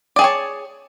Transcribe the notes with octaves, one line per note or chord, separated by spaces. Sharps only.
G#4 C#5 D5 A5